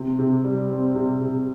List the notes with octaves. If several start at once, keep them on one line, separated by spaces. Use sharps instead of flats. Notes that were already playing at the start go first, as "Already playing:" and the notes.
Already playing: C3
C3
G3
C4
C3
C3